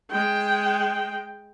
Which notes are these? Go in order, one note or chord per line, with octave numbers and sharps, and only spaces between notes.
G#3 G5